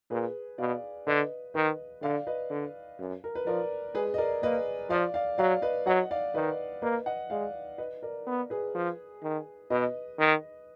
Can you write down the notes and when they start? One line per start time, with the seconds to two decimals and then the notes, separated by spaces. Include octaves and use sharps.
0.10 A#2 G#4 B4
0.58 B2 D5 F5
1.07 D3 B4 D#5
1.54 D#3 B4 D#5
2.02 D3 D5 F5
2.27 B4 D#5
2.50 D3
2.99 F#2
3.24 A#4
3.35 B4
3.46 F3 A#4 D5
3.95 G#3 G#4 B4
4.14 D#5
4.18 A#4 D5
4.42 A#3 B4 D#5
4.90 F3 D5 F5
5.14 D5 F5
5.38 F#3 D5 F5
5.62 B4 D#5
5.86 F#3 D#5 F#5
6.11 D5 F5
6.34 D#3 B4 D#5
6.82 A#3 B4 D#5
7.06 D#5 F#5
7.30 G#3 D5 F5
7.78 B4 D#5
8.03 A#4 D5
8.27 B3
8.50 G#4 B4
8.75 F3
9.23 D#3
9.70 B2 B4 D#5
10.19 D#3